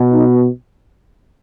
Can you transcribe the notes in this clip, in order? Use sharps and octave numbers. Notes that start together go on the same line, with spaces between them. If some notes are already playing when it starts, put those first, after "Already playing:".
Already playing: B2
D#4